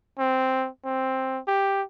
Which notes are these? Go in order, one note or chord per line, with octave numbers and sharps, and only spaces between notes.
C4
C4
G4